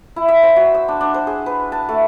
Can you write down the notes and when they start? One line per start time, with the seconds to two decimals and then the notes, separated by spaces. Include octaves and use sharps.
0.16 E4
0.28 E5
0.43 C5
0.56 F#4
0.75 E6
0.88 D4
1.01 D4
1.14 C5
1.27 G#4
1.46 B4
1.72 A5
1.89 A3